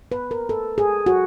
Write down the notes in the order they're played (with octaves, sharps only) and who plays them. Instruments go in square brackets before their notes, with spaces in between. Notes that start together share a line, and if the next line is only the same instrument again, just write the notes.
[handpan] B4
A#4
A4
G#4
F#4